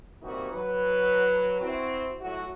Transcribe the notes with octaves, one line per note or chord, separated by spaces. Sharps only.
E3 G3 A#3 C4 D#4 F#4
F#3 B4
C4 E4 F#4
F#3 A3 E4 F#4